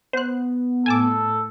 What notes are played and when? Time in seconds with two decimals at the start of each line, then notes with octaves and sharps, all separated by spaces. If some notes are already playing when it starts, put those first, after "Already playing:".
0.13 B3 C5 F#6
0.86 A2 A4 G#5 A5 D6